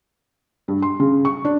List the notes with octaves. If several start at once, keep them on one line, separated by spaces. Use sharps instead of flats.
G2
C6
C#3
C#6
D4